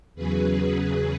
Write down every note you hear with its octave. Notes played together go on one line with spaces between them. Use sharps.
E2 C#3 F#3 G#4 B4